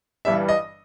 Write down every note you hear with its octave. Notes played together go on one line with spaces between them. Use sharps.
G1 G2 E3 G3 E5
D#5